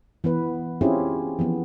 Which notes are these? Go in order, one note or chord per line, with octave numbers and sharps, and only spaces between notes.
E3 B3 B4
C4 C#4 E4 F4 G4 G#4
E3 F3 B3